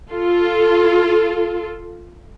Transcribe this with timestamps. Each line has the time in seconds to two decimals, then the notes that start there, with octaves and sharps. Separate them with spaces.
0.11 F4 A4